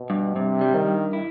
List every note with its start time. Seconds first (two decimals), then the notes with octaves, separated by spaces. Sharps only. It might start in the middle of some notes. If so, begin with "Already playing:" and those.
Already playing: B2
0.10 G2
0.35 G2 C3
0.61 G3
0.74 D#3
0.88 G2
1.13 E4